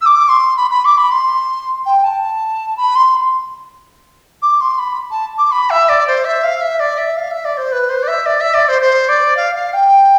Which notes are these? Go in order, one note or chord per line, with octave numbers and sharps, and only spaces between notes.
E6
D6
C6
B5
B5
D6
B5
C6
G5
A5
B5
C6
D6
C6
B5
A5
D6
B5
E5
D5
C5
E5
F5
E5
D5
E5
F5
E5
D5
C5
B4
C5
D5
E5
D5
E5
D5
C5
C5
D5
F5
F5
G5